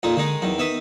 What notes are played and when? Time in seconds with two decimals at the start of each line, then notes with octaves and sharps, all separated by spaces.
0.03 F2 A#2 D#4 F4
0.17 D3 D#3 G#3 D#4
0.42 E2 D#3 F#3
0.59 D#3 B3 E5 D#6